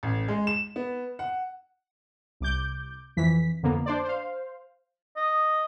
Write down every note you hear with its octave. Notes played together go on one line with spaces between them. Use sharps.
A1
G#3
E7
B3
F#5
C2 D6 G6
F2 E3 B6
F2 D3 A#3 B3
D4 C5 D5
C5 F5
D#5